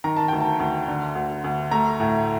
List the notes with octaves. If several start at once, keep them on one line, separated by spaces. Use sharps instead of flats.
D#3 A#5
A5
D2 G5
A5
D2
D3
D2
D2
A3 A#5
A2